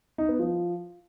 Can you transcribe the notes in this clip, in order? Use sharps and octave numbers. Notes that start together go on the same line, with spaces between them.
D#4
B3
F3